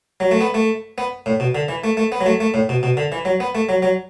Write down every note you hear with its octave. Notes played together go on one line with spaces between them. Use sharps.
F#3
A3
B3
A3
B3
A2
B2
D3
E3
A3
A3
B3
F#3
A3
A3
A2
B2
B2
D3
E3
F#3
B3
A3
F#3
F#3